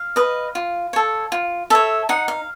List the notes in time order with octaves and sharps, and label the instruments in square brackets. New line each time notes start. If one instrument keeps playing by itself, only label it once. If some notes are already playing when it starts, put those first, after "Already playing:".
Already playing: [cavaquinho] F5
B4 D#5
F4
A4 C#5
F4
A4 C#5 E5
D#4 F#5
F5